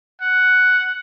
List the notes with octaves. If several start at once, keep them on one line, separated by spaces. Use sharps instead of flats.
F#5